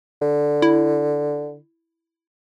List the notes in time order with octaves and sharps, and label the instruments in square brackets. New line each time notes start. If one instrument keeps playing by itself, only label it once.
[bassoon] D3
[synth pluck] E4